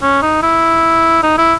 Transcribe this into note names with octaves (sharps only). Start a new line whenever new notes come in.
C#4
D#4
E4
D#4
E4